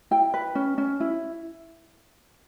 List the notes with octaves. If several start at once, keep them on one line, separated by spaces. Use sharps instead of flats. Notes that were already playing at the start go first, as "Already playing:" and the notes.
E4 G5
B4
C#4
C#4
E4